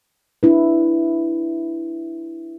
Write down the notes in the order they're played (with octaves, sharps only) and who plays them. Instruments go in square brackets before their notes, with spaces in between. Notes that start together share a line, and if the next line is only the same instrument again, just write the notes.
[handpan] D4 E4 B4